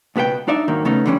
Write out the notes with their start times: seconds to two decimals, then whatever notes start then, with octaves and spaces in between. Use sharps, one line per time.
0.16 C#2 B2 B3 G#4 G5
0.48 D4 D#4 D5 E5
0.68 G#2 D#3 F#3 A#3
0.85 C#3 A3 B3 C#4 D#4
1.06 D3 F3 G3 G#3 C#4